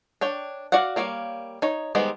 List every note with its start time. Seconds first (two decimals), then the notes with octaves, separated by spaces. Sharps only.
0.21 D4 C#5 G5
0.72 F#4 D5 F5 F#5
0.96 G3 A#3 C#5 F5
1.62 D#4 C#5
1.95 D#3 G3 G#3 B3 C5